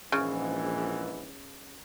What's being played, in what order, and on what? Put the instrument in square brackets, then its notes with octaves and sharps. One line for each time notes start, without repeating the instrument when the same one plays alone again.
[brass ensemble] A#1 G#2 E3 [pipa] C#3